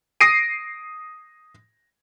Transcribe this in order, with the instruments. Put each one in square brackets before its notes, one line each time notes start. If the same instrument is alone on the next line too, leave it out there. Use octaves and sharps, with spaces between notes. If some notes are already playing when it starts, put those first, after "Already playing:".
[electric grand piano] D#6 A#6 C7 D7 D#7